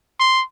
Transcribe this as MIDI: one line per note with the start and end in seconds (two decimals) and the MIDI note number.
0.20 0.43 84